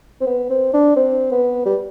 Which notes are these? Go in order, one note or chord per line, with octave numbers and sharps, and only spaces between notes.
C4
B3
C4
D4
C4
B3
G3